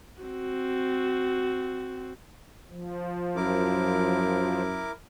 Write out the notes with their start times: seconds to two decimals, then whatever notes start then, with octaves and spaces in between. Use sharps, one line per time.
0.22 C4 F#4
2.69 F3
3.36 F#2 E4 A#4 D6